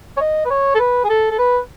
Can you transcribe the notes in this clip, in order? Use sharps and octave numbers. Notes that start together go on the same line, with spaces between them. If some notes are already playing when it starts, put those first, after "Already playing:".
C#5
D#5
B4
C#5
A4
B4
G#4
A4
A4
B4